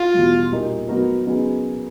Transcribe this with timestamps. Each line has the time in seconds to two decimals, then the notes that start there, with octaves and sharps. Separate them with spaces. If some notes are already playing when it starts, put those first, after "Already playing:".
Already playing: F4
0.14 E2 B2 G3
0.51 A#2 G3 A#3 D#4 G4
0.88 F#3 B3 D#4 F#4 A#4
1.26 C#3 F#3 B3 D#4 G#4